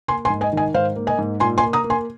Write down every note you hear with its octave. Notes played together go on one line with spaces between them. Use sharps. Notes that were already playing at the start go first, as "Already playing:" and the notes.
A#3 G#5 C6
G#5 C6
G#2
D#5 G#5
D#3 D#5 G#5
G#2 C5 F5
A#3
D#5 G#5
G#2
A#2 G#5 C6
G#5 C6
A#3
A#5 D#6
A#3
G#5 C6